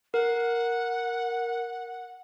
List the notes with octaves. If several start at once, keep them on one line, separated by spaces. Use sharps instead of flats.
A#4 F#5